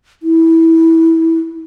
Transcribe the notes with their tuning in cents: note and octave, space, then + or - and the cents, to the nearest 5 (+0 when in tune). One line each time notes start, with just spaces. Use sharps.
E4 -15